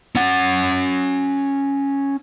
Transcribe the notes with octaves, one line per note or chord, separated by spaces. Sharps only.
C#4 F#5